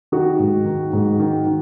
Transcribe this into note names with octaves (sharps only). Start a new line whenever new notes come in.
D#3 F#4
G#2
D#3
G#2
D#3
D#3